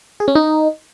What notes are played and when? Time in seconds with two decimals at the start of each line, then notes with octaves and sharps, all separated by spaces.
0.20 G#4
0.28 C#4
0.35 D#4